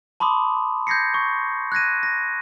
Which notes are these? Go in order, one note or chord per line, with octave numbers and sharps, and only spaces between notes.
A5 B5 C6 D6 D#6
G6 G#6 A#6 C7 C#7
C#6
F#6 G#6 A#6 D#7
A#6